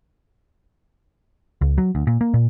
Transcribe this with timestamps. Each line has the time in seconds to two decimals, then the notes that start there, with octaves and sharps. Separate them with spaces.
1.61 C#2
1.78 F#3
1.95 D2
2.07 A#2
2.21 A#3
2.34 A#2